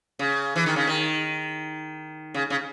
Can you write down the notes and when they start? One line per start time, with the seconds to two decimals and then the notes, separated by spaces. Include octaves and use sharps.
0.19 C#3
0.56 E3
0.66 D#3
0.76 C#3
0.87 D#3
2.34 C#3
2.50 C#3